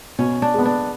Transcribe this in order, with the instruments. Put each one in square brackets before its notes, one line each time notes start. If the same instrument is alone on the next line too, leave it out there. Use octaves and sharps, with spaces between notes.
[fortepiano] B2 [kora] C#4
[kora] D4
[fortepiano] G#3 B3
[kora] D4